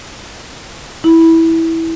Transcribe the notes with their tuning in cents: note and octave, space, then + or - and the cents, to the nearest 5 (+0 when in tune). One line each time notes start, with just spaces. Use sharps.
E4 -10